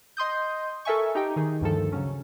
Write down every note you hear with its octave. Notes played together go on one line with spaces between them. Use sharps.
D#5 C6 D#6 G6
A4 A#4 E5 G#5 C#6
D#4 G4 G5
D#3 D#4 G#4
D2 G2 D#3 F3 A4
C#3 F#3 C#4